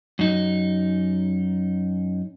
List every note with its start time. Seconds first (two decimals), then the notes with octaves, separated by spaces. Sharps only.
0.19 F#2 D#4